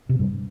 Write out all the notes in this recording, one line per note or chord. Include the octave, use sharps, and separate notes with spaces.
C3
G2